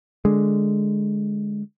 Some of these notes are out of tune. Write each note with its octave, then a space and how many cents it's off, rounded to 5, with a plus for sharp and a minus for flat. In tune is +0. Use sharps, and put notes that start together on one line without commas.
D3 +0 G#3 +0